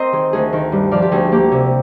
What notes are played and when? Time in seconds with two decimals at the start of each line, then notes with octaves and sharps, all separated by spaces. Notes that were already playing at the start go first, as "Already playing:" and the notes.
Already playing: C4 A#4 C5 D#5
0.12 D#3 G#4
0.33 D2 G#4
0.53 D#3
0.72 G2
0.91 F3 D5 F5
1.02 G4
1.12 D2 G#4
1.32 A#3 G4
1.52 C3